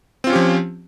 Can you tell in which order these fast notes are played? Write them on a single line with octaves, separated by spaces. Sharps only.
C4 F4 C#4 G4 F3